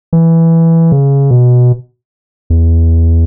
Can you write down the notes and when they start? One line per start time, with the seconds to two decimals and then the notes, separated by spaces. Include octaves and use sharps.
0.13 E3
0.92 C#3
1.31 B2
2.50 E2